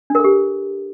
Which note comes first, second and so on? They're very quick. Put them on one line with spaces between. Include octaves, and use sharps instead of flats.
D4 A#4 A4 G4